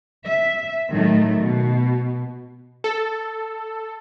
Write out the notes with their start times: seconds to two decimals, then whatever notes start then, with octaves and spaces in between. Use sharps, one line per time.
0.25 E5
0.91 A2 D#3 F#3 A3
1.39 B2
2.84 A4